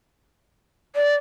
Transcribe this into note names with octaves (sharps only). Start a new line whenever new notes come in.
D5